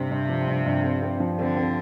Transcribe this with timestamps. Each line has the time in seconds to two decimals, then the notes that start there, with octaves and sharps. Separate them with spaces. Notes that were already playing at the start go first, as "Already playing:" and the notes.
Already playing: G2 C3 C4
0.10 G2
0.29 F3
0.48 G2
0.66 G2
0.84 C4
1.02 C4
1.20 F3
1.39 D3 C4
1.57 C4